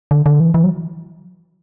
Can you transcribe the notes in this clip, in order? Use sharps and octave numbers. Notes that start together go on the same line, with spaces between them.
D3
D3
E3
E3
F#3